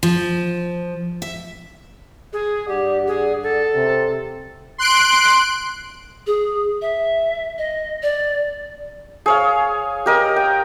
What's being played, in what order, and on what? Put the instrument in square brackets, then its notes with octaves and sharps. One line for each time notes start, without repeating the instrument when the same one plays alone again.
[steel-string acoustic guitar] F3
E5
[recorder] G#4
[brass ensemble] G2 D5 F#5 [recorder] G4
[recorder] G#4
A4
[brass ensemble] C3
[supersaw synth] C6 F#6 D7
[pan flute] G#4
E5
D#5
D5
[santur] G#4 C#5 F5
G4 A#4 D#5
G5